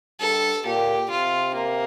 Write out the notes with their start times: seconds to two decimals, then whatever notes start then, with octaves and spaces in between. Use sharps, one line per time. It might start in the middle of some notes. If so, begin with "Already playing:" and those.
0.20 G2 A4
0.65 A#2 G4
1.10 C3 F4
1.54 A#3